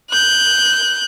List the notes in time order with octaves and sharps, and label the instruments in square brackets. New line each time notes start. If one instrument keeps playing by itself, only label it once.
[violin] F#6 G6